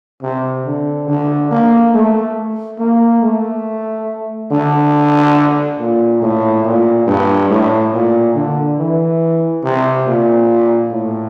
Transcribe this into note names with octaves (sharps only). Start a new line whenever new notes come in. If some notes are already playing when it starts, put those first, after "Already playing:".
C3
D3
D3
A#3
A3
A#3
A3
D3
A#2
A2
A#2
G2
A2
A#2
D3
E3
C3
A#2
A2